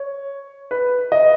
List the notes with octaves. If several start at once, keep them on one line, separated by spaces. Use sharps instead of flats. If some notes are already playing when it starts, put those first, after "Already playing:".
Already playing: C#5
B4
D#5